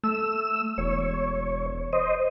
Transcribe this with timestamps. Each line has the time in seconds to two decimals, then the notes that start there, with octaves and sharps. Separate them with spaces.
0.04 A3 E6
0.78 E1 C#5
1.93 C5 D#5